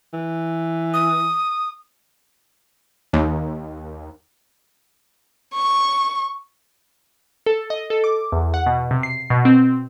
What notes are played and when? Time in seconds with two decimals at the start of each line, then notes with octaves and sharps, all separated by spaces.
0.13 E3
0.94 D#6
3.13 D#2
5.54 C#6
7.46 A4
7.70 D#5
7.90 A4
8.04 D6
8.32 E2
8.54 F#5
8.66 B2
8.91 C3
9.03 C7
9.30 B2
9.45 C4